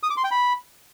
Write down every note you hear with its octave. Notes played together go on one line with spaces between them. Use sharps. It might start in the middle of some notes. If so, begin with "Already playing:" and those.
D#6
D6
C6
G5
B5